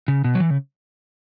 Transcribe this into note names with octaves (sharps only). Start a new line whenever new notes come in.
C#3
B2
F#3
E3
C#3